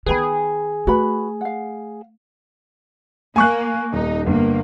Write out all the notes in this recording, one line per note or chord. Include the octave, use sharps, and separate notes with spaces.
D#3 B3 G#4 B4 G5 B5
A3 F#4 B4 B5
F5 F#5
A#3 G#5 C#6 F#6
D#1 D#4
G1 A#3